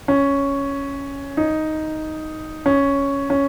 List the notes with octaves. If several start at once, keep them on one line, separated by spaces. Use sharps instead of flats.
C#4
D#4
C#4
C#4